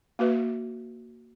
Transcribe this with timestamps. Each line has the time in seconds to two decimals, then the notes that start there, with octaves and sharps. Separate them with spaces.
0.19 A#3 F#4 B4 E5